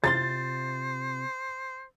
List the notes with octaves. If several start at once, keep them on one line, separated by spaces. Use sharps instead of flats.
C3 F4 C5 C6 A6